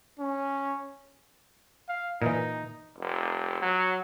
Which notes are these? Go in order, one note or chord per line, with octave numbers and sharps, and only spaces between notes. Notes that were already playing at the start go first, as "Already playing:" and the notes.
C#4
F5
A#2 E3 D#4
F1
F#3